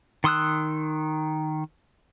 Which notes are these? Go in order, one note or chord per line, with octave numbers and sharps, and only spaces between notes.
D#3 C6 D#6 E6 F#6